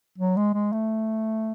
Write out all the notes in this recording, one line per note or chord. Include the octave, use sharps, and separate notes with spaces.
F#3
G#3
G#3
A3